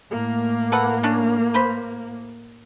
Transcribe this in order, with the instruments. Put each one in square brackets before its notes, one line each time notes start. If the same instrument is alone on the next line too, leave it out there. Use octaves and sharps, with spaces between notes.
[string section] A2 A#3
[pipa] A4 B4 F#5
C#4 D4
B4 C5 B5